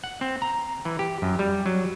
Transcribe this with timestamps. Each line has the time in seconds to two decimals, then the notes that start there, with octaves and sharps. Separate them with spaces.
0.04 F#5
0.21 C4
0.42 A#5
0.85 E3
0.99 G4
1.22 F#2
1.39 G3
1.66 F#3